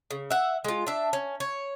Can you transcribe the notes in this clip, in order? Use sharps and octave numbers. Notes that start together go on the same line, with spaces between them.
C#3
E5 F#5
G#3 F4
D4 E5
C#4
C#5